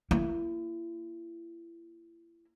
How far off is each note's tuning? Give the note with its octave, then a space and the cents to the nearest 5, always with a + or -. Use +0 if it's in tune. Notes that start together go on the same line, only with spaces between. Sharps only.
A#3 +0 E4 +35